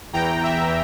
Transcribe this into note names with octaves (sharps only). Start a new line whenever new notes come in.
E2 E3 G5 A#5
E5 G5